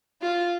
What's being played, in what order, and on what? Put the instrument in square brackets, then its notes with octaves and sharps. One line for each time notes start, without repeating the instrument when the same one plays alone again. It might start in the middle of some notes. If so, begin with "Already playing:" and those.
[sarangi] F4